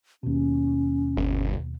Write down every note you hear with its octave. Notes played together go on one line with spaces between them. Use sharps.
D#2 B2 C#4
G1